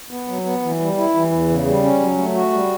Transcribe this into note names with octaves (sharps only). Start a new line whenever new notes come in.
B3
F#3
B3
E3
G3
E4
E3
E2
C#3
G3
C#4
F#3
A3
F#4
G3